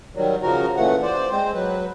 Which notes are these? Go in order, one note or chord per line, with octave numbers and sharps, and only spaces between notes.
D#3 F#3 G3
C#3 F3 F#4 A#4
A#2 C#3 E3 A3 F#5
C5 D5
G#3 C4 C5
F#3 B4